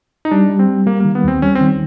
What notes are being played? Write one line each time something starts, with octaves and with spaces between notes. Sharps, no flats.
D#4
G3 D4
G3
C4
G3
G3 A#3
D#3 A#3
B3
D#2 C4
G3 C#4
C4
D#3